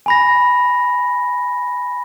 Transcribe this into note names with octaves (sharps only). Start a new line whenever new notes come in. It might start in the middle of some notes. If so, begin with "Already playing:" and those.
G#5 B5 A#6